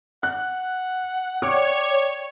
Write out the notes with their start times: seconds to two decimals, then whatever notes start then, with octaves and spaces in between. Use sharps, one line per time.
0.23 F#5 F#6
1.42 C#5 D5 G5 D6